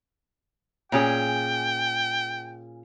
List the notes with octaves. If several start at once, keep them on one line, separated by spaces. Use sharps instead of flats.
A#2 C#4 G#4 G5